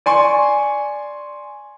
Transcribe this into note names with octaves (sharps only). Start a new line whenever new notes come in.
D5 G#5 C6 C#6